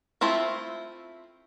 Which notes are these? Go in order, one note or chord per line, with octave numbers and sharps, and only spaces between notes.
A3 C4 E4 F4